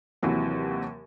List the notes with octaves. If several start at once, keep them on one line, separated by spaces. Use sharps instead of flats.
D#2 C3 E3 F#3